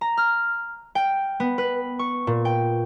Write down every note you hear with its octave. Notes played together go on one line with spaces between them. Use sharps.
A#5
F6
G5
B3
B4
C#6
A#2
G5